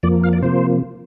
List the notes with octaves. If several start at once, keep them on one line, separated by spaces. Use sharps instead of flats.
F2 F3 A#3 D5
F5
D5
C3 F3 A#3 C5